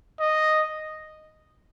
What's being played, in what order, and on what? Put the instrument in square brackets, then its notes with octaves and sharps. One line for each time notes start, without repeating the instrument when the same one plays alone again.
[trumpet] D#5